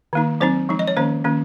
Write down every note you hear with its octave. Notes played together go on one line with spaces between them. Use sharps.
D#3 A#3 D#4
F#3 C4 D#4 C5
F3 G#3 D#4
D#5
C#5
D#3 A#3 C#4 C5
D#3 A#3 C#4